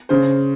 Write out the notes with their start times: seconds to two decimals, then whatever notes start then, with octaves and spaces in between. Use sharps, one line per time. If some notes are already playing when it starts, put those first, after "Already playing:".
0.09 C#3 C5